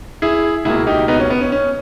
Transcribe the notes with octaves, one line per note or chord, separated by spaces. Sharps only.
E4 G#4
C#2 B2 A#3 E4 G#4
D#4 G4
B3 D#4
C#4
B3
C#4
C#4